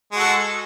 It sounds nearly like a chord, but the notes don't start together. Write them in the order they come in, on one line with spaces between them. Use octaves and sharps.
G#3 F#4 A4